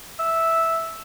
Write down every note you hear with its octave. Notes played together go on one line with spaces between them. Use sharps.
E5